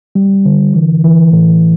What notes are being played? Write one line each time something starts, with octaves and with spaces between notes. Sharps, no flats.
G3
D3
E3
E3
A2